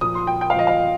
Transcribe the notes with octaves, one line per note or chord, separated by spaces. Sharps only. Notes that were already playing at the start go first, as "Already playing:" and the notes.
A#2 F3 D#6
C6
G5
G5
F5
A#2 F3 D#5
F5